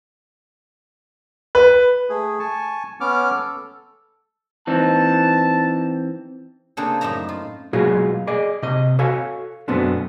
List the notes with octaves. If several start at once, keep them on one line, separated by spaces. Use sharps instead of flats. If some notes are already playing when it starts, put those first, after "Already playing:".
B4
A3 G#4
G#5 A5 C#6
B3 C#4 D6 F6
A4
E3 C4 D#4 A5
C#3 A#3 C4 D4 G#4 A4
F#2 A2 D#4 E5 A#5
F4
B2 F#3 G#3 F4 F#4 G#4
G#4 D5 D#5
C3 D#5
F#4 A4 C#5 F5 G#5
F#2 B2 A3 B3 C4 D4